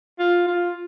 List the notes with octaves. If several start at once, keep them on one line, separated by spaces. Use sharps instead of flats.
F4
F4